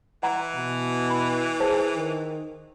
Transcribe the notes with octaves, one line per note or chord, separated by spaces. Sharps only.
E3 F#5 A#5 C6
B2
B5
G#4 C5 A5
D#3